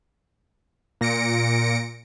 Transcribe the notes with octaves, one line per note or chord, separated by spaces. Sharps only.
A#2 A#6 C#7 D7